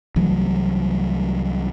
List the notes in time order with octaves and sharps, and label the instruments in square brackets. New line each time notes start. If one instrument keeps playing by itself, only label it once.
[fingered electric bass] C2 E3 F#3 A3